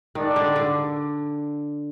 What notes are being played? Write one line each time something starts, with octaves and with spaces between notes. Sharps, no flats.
D#3 D4 A4 D5 F#5
D3
D3